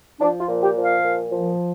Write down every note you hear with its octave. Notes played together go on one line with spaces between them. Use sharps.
F3 D4
F4
A#2
G4
F3
F5
A#2
F3